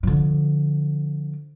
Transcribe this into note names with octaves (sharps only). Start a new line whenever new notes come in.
D3 F3